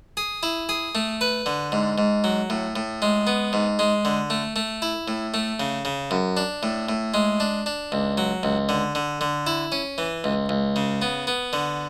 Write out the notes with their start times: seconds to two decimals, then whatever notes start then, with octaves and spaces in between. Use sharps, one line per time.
0.17 G#4
0.43 E4
0.69 G#4
0.95 A3
1.21 B4
1.46 D3
1.72 G#2
1.98 G#2
2.24 F#3
2.50 A2
2.76 A2
3.02 G#3
3.27 B3
3.53 G#2
3.79 G#3
4.05 D3
4.30 A3
4.56 A3
4.82 E4
5.08 A2
5.34 A3
5.60 C#3
5.85 C#3
6.11 F#2
6.37 D4
6.63 A2
6.89 A2
7.14 G#3
7.40 D4
7.66 D4
7.92 C#2
8.18 F#3
8.43 C#2
8.69 D3
8.95 D3
9.21 D3
9.47 E4
9.72 C#4
9.98 E3
10.24 C#2
10.49 C#2
10.76 C#3
11.02 B3
11.27 B3
11.53 D3